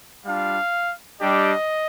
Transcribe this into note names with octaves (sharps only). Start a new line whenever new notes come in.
G3 D4 F4 F5
G3 D4 G4 D#5